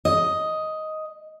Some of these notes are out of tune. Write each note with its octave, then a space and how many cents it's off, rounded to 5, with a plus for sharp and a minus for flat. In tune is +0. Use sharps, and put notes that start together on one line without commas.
D#5 +5